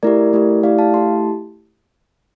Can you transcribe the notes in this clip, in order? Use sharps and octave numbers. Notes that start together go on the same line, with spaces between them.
A3 E4 G4 A#4 D5
A3 E4 G4
A3 E4 G4 D5 F5
F5 A5
A3 E4 G4 A5 C6